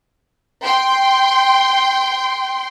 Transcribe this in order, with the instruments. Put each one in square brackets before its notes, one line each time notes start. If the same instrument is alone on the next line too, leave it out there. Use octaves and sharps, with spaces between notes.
[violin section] G5 C6